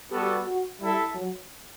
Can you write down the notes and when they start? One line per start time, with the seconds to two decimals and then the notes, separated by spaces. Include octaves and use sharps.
0.10 G3 B3 F#4 G4 A4
0.46 F#4
0.79 G3 E4 A4 E5
1.14 F#3